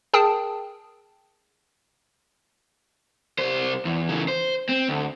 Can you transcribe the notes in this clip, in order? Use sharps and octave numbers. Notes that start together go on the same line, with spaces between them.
G#4 A#4 G5 A5 D#6
C2 C5
E2
C#3 E3
C5
C4
D2